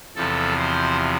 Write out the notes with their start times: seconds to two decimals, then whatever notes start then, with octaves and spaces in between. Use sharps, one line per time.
0.16 E2 C3 F3 A4
0.58 C5